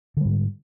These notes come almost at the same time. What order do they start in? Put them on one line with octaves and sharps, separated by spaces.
D3 G3 G#2